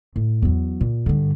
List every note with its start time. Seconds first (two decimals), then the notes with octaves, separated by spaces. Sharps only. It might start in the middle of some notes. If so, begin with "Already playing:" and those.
0.16 A2
0.42 E2 F#3
0.81 A#2
1.06 G2 D3